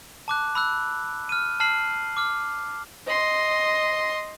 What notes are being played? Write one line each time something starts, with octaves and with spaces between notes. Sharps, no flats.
A5 D6 F#6
B5 E6 F#6
F6 D#7
A5 F6 C7 F#7
D6 F6
D#5 C6